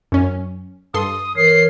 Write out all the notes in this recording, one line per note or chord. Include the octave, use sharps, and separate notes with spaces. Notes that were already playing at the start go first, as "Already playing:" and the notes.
F#2 C#4
G2 A4 C6 D#6
E3 A#4 C#5 C7